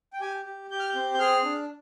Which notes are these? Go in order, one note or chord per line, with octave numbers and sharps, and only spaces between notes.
G5
G4 G#5
G4
G4 G6
F6
G6
C4
G6
G#4 F6
D4